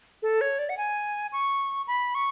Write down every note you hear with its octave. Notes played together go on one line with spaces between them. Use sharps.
A4
C#5
D5
F#5
G#5
C#6
B5
C#6